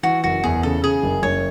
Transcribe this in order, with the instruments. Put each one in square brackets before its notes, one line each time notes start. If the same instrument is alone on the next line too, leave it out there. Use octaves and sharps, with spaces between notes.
[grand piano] E3 [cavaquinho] F#4
[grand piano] F#1 [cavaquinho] F#4
[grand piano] E2 [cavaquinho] G#4
[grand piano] C#3 [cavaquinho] A4
[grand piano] C#3 [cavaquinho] G#4
[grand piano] F#1
[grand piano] F#1 [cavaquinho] C#5